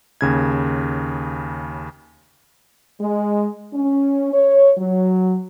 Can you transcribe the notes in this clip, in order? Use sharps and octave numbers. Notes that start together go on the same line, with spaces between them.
D#2 C#3 G#6
G#3
C#4
C#5
F#3